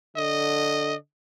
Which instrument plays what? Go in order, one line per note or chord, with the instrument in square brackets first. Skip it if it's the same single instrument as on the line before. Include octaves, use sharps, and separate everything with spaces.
[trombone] D3 [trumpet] D#5